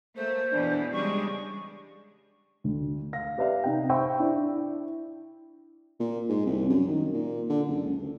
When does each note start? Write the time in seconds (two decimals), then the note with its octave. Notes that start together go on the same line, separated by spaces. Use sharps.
0.16 A3 A#3 C5
0.52 E2 B2 E3 D4
0.93 C#3 G3 G#3 D4 C#6
2.64 D2
3.13 F5 A#6
3.38 G4 B4 D5 E5 F5
3.64 C3 D#4 G5
3.89 C5 E5 G5 B5 C#6 E6
4.19 D4 E4
6.00 A#2
6.29 G#2
6.45 C2
6.70 F#2
6.87 D#3
7.13 A#2
7.50 D3
7.68 F#1
7.82 C#2
8.02 D2